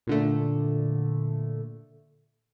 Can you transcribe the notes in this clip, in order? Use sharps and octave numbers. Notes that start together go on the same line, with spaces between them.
A#2 D3 A3